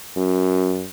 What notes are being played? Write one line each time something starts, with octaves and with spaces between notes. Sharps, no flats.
F#2